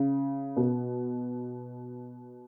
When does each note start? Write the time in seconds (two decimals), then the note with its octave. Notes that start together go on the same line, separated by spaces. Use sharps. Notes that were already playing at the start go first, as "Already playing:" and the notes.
Already playing: C#3
0.57 B2